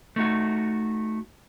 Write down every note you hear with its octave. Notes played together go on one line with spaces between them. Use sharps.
A3 D#4 F#4